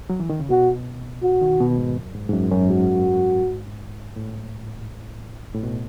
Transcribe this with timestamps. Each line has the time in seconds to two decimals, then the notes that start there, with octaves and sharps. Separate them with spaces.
0.10 F#3
0.20 E3
0.30 D#3
0.40 C#3
0.50 B2 F#4
1.23 F#4
1.41 D#3
1.60 B2
1.78 G#2
1.96 F#2
2.15 G#2
2.29 G#2
2.33 F#2
2.51 F#2
2.70 G#2 F#4
4.16 A2
5.54 A2
5.63 B2